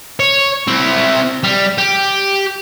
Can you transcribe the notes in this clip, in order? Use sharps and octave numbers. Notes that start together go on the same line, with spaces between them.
C#5
C4 E4
G3
G4